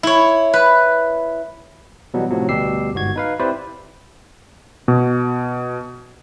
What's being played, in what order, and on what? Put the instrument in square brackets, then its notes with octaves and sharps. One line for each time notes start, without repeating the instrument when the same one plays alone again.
[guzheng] E4 C#5
B4
[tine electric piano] B2 E3 F#3 G3 B3
A2 C3 F3 F#3
D2 B2 G3 G4 E6 C7
G1 G#2 F#4 G#6
D#4 B4 F5
C4 E4 G4 B4 C5 D5
[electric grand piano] B2